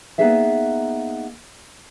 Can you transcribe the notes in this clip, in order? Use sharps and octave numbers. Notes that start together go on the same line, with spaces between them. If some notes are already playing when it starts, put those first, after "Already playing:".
A#3 B3 D#4 G#4 E5 F5